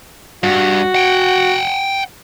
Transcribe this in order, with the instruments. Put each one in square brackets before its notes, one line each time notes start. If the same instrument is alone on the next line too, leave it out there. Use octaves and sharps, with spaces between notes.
[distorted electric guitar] G2 [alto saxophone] F#4
[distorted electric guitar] F#5 G5